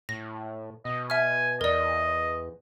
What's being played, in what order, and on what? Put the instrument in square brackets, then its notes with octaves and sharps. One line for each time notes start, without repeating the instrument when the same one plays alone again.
[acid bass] A2 [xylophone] A#6
[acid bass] B2 [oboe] D#5
[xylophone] E5 F6 [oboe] G#5
[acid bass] E2 [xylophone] A#4 D5 [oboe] D#5